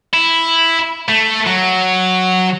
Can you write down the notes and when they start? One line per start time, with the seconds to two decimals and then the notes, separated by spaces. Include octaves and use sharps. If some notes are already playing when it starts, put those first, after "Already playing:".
0.13 E4
1.09 A3
1.47 F#3